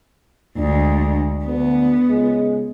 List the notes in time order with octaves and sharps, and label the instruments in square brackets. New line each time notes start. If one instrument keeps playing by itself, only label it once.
[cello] D2 G#3 [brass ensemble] D4
[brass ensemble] D2 [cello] B3
[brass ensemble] C#2 G#3